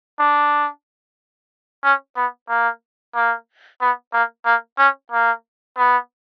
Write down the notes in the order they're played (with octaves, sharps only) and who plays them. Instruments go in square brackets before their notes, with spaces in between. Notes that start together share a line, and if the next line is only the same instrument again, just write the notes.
[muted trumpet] D4
C#4
B3
A#3
A#3
B3
A#3
A#3
C#4
A#3
B3